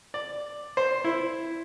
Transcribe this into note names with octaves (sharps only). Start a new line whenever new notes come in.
D5
C5
E4